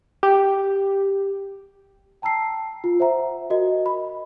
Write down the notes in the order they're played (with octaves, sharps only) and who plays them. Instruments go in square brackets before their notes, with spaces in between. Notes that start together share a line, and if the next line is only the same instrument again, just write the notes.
[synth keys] G4
[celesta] G5 A5 A#5 E6 C7
F4
C5 E5 F#5 A#5
F#4 A#4 D#5
B5